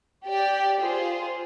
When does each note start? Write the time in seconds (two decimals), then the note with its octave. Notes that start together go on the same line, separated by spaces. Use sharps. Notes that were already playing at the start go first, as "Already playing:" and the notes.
0.27 G4 D5 G5
0.80 F4 G#4 C5